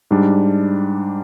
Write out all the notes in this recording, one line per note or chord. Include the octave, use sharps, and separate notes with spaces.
G#2 G3 D4